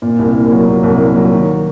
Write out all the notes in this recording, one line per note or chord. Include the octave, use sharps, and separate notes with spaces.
A#2
C2
A#3
F#3
A#2
C2
A#3
F#3
D#3